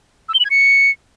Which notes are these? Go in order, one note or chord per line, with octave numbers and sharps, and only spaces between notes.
E6
G7
F#7
G#6
C#7